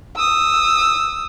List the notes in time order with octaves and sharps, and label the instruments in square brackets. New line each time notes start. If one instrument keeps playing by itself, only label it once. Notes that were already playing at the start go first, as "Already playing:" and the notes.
[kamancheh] D#6 E6